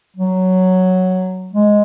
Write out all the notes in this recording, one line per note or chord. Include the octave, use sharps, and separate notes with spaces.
F#3
G#3